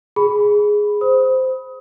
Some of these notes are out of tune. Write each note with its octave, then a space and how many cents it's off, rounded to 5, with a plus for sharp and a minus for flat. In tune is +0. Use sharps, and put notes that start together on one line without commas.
G#4 +0 B5 +0
C5 -10 D#6 +25